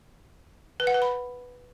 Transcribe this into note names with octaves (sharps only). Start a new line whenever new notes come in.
B4
F#5
B4
B5